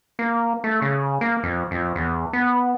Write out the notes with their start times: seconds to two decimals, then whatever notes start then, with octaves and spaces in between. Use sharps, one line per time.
0.19 A#3
0.64 A3
0.82 C#3
1.21 A#3
1.43 F2
1.71 F2
1.95 E2
2.33 B3